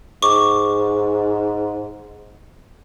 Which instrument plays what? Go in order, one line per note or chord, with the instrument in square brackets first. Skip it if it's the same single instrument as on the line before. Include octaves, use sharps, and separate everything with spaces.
[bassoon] G#2 [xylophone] C#6 D6